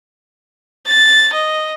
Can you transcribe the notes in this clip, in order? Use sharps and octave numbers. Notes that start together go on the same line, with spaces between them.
A6
D#5